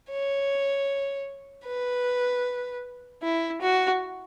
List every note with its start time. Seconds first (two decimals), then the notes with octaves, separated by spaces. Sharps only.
0.11 C#5
1.66 B4
3.23 E4
3.61 F#4